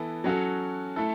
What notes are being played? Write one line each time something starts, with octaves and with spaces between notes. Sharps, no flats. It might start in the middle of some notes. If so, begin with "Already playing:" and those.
Already playing: E3 B3 E4 A4
F#3 C#4 F#4 A4
A3 E4 A4